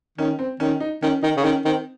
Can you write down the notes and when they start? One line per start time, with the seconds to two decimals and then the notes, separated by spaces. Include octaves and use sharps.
0.18 D#3 C#4
0.39 C4
0.60 D#3 C#4
0.80 D#4
1.02 D#3 C#4
1.23 D#3 D#4
1.37 C#3
1.44 D#3 C#4
1.65 D#3 C4